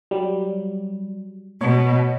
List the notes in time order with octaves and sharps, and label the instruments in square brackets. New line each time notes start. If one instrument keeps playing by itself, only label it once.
[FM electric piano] F#3 G3
[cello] B2 [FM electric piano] C#5